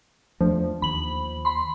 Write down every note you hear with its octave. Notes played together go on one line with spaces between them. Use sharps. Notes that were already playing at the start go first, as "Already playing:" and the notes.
E2 F3 A3 D4
D#2 B5 F#7
B5 C6